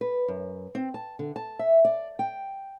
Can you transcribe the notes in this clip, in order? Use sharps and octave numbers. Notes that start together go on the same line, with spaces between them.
B4
F#2
C4
A5
D3
A5
E5
D5
G5